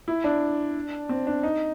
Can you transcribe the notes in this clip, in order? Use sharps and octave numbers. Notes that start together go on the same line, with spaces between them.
E4
D4
C4
D4
D#4